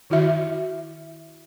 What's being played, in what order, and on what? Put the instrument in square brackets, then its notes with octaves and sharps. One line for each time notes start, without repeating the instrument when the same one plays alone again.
[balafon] D#3 E4 F#4 E5